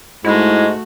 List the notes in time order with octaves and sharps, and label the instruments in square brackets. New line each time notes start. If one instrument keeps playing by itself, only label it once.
[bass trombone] G#2 [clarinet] G#3 [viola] A3 F#4 [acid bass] E4